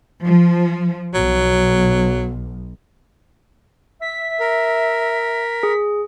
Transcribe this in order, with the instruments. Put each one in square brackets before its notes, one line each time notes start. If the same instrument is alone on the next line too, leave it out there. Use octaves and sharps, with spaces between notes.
[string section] F3
[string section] B1 [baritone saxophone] F#3
[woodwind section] E5 [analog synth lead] B6
[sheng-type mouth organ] A#4
[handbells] G#4